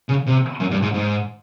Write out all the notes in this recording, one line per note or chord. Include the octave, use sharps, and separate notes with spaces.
C#3
C3
F#2
G2
G#2
G#2